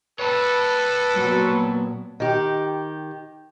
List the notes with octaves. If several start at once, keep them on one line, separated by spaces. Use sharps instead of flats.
A4 B4 C#5 G5 A5
A#2 F#3 B3
D#3 G4